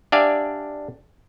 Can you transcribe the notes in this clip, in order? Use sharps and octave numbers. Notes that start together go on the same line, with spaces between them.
D4 G4 D5 E5 F5 G#5